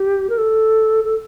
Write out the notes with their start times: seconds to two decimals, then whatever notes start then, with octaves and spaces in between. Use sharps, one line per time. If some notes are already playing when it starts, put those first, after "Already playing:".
Already playing: G4
0.30 A#4
0.38 A4
1.04 A4